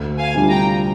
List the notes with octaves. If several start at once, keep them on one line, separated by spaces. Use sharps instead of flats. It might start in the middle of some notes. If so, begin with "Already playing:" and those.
Already playing: D2
F5 G#5
C3 G3 D4 F4
G5 A#5